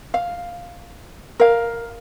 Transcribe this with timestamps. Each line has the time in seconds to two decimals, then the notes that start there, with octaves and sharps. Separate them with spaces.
0.14 F5
1.40 A#4 F5